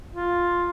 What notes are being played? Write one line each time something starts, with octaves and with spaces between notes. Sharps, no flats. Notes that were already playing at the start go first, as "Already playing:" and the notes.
F4